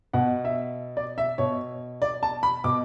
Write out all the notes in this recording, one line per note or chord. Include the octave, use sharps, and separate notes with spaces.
B2 F#5
E5
D5
E5
B2 C#5
D5
A5
B5
B2 D6